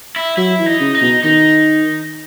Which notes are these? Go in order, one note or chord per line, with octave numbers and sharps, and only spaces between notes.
E4
F#3 E4
E3
D#4
C#3
D#4
B2
D#3 D#4